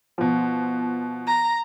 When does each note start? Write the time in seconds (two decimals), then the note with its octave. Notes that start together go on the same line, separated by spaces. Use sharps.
0.18 B2 F3
1.27 A#5